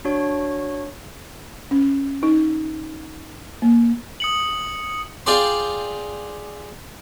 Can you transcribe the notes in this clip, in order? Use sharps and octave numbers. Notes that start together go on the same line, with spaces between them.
D4 F#4 C#5
C#4
D#4
A#3
D#6 C#7 F#7
F4 G#4 D5 G5 C6